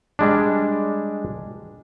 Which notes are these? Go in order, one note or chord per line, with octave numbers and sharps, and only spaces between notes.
G3 G#3 D4